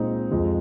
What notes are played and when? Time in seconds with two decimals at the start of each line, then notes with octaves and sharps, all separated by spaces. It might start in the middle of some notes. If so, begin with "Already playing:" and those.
Already playing: A#2 G#3 C4 D#4
0.31 F2 F3 G#3